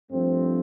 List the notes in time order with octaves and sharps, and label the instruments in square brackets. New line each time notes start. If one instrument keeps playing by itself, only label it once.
[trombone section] G2 F3 A3 C4